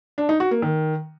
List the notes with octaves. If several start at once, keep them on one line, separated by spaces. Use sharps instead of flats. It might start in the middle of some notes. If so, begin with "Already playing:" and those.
D4
D#4
F#4
A#3
D#3